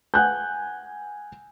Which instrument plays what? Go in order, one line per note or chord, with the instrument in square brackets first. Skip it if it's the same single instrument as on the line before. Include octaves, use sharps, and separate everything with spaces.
[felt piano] F#5 G#5 F#6 G6